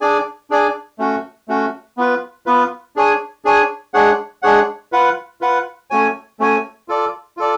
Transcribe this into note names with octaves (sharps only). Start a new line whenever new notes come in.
D4 G#4 D5 G#5
D4 G#4 D5 G#5
A3 C#4 F#4
A3 C#4 F#4
B3 F4 B4
B3 F4 B4
D4 G#4 C#5 G#5
D4 G#4 C#5 G#5
G#3 D4 G#4 C#5 F#5
G#3 D4 G#4 C#5 F#5
F4 B4 F#5
F4 B4 F#5
A3 C#4 F#4 C#5 G#5
A3 C#4 F#4 C#5 G#5
F4 A4 D5
F4 A4 D5